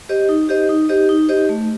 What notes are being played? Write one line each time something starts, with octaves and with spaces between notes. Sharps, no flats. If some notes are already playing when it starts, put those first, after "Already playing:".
G4 C5 D#5
D#4
G4 C5 D#5
D#4
G4 C5 D#5
D#4
G4 C5 D#5
A3